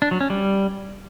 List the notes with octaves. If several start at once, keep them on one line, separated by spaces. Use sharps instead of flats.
D4
F#3
C#4
G3